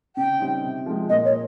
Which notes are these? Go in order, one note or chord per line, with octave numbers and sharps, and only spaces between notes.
C#3 G5
G3 C4 D#4
C3
F3 G#3
A#2 D#5
C#5